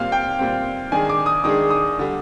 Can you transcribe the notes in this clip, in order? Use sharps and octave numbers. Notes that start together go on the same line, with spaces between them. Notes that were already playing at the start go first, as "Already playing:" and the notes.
Already playing: A#2 G3 C4 F5
G5
A#2 G3 C4
D#3 G#3 D4 G#4 G#5
D6
D#6
D#3 G#3 D4 G#4 D#6
D#6
D3 G3